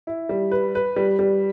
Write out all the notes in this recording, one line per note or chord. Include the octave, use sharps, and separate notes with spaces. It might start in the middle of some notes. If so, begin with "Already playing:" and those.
E4
G3
B4
B4
G3
G3